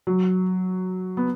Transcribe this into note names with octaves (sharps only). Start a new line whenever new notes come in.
F#3
B3